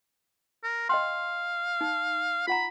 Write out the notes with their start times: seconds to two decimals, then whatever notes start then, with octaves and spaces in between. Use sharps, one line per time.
0.64 A#4
0.89 D#5 F5 G5 C6
1.81 D#4
2.47 F4 F#5 A#5 B5